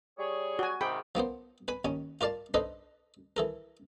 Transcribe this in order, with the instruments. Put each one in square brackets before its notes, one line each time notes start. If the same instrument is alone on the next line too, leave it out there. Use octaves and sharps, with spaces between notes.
[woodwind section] G3 G#4 C#5
[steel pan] F#4 G#5
[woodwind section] G#2 C3 D#3 [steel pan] G#4 G5 B5
[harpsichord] F3 A#3 B3 C5
B4 G#5 B5
D#2 C#4 G#5
F4 A#4 D5 F5 A5
D4 D#4 A4 B4 C5 D#5
E3 A4 A#4